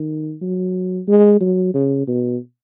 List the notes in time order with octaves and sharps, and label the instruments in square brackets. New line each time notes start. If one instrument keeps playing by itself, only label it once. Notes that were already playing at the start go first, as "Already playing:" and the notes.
Already playing: [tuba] D#3
F#3
G#3
F#3
C#3
B2